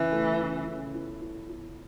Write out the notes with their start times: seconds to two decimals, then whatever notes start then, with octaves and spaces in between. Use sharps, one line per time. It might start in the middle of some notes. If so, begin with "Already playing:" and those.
Already playing: C#3 E3
0.12 A3
0.40 C#3
0.66 C#3
0.94 E4
1.21 E4
1.49 E4